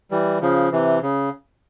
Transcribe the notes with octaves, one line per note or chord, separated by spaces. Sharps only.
E3 G3
C#3 F3
C3 E3
C#3